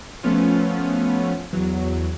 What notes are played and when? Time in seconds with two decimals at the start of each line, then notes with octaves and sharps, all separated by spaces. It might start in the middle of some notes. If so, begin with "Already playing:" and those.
0.23 F3 A3 B3 C#4 F4
1.53 E2 F#3